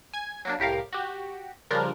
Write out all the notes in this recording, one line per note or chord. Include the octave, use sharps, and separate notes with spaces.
G#5 G#6
F#3 A#3 D4
C2 A2 G4 A#4 F5
F#4 G4
C#3 F3 G3 D4 F4 A#4